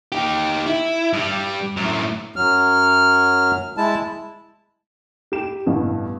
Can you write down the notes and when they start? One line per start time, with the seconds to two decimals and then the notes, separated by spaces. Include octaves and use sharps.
0.12 D#4 G4
0.66 E4
1.13 G2 G3
1.77 F#2 A2
2.36 F#2 F#3 F6
3.77 G#3 E4 A5
5.32 G4 E7
5.67 A1 G2 B2